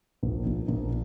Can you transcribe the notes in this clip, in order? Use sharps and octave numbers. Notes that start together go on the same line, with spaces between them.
A#1
A#1
A#1